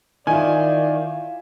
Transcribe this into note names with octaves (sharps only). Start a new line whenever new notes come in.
D#3 E4 F4 D5 G#5